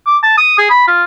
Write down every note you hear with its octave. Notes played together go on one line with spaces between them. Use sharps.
D6
A5
D#6
G#4
B5
F4